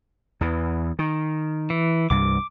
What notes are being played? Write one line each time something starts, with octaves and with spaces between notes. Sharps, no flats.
E2 E3
D#3
E3
C2 G2 D6